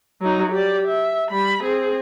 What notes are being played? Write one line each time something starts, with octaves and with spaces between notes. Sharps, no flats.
F#3 D#4
G4 D5
E5
G3 B5
C4 G#4